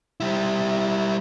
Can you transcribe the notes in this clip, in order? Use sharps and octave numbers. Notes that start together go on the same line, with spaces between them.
G3 E4